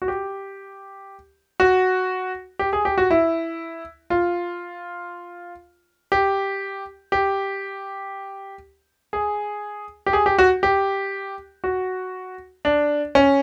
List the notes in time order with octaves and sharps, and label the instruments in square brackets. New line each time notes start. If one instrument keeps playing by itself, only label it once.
[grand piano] F#4
G4
F#4
G4
G#4
G4
F#4
E4
F4
G4
G4
G#4
G4
G#4
G4
F#4
G4
F#4
D4
C#4